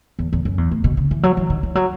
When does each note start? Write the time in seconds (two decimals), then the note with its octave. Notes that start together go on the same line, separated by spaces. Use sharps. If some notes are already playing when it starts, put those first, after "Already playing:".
0.19 E2
0.33 E2
0.45 F#2
0.58 E2
0.71 A2
0.84 B2
0.97 C#3
1.11 E3
1.23 F#3
1.37 E3
1.50 D#3
1.63 E3
1.75 F#3